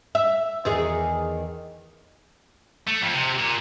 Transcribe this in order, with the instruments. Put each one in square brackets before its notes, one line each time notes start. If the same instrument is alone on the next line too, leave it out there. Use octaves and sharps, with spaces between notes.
[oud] E5
E2 D#3 G#4
[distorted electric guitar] A3
F2
C3
A#2